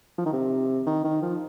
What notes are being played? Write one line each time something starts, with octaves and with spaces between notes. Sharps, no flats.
F3
D#3
C3
D#3
D#3
F3